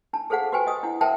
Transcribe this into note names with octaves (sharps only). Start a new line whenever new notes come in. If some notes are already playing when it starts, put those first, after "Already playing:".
D4 A5
G#4 A4 C5 F5 F#5
F#4 G4 B4 C5 G5 G#5
D#5 D#6
D4 E4 F#5
A#4 C5 E5 F#5 G5 A5